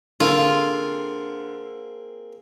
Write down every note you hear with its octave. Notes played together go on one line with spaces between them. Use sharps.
D3 A#3 C4 F4 G#4